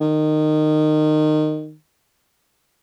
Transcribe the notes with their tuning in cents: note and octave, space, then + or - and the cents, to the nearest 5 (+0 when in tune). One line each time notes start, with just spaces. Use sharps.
D#3 -20